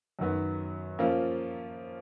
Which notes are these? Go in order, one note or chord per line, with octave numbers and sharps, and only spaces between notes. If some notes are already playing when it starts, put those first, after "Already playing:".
F#2 D#3 F#3 B3
F3 A#3 C#4 F4